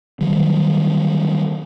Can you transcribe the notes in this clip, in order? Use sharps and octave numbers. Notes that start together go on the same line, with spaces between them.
D#3 F#3 G3